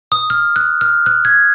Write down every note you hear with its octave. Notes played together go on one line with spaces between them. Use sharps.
D#6
F6
F#6
F6
F#6
G#6